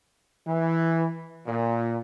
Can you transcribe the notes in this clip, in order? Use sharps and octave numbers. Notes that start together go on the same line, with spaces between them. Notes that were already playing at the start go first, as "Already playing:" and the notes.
E3
A#2